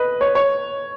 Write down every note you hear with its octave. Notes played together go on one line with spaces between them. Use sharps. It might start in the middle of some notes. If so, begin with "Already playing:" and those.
Already playing: B4 D#5
C#5
C#5